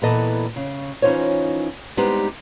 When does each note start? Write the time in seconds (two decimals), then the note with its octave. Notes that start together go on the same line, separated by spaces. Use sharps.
0.02 A#2 E3 B3 A4 D#5
0.56 C#3
1.02 E3 C#4 D#4 F4 C5 C#5
1.97 G3 G#3 B3 C4 D#4 G4